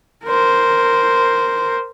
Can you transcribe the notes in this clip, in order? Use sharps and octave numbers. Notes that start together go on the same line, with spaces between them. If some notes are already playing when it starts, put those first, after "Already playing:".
A#4 C5